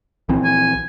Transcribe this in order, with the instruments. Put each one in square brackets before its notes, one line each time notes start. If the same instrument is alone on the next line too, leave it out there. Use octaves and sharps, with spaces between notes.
[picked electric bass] A#1 E3 C4
[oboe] G#5